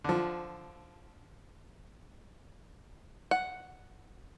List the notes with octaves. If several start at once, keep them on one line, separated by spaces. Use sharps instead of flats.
D3 F3
F#5